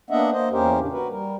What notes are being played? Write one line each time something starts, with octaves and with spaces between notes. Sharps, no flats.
A#3 B3 D4 D#5 E5 F#5
A#3 C5 D#5
E2 A#3 C#4 G4 A#4 C5
A2 C#3 D4
F#4 A#4 B4
G3 A#4